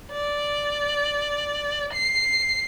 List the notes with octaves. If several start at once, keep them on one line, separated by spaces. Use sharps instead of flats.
D5
C7